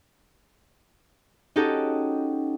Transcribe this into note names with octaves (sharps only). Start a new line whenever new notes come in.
C#4 D#4 F#4 G4 A4